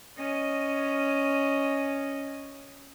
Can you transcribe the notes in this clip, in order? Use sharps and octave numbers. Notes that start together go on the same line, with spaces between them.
C#4 D#5